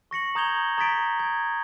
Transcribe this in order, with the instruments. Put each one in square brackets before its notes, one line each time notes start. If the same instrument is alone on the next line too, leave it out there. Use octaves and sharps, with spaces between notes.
[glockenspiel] C#6 A#6 C#7 F#7
A#5 D#6 G6 G#6 F7 G7
A#5 D#6 G#6 A6 B6 D7
G#6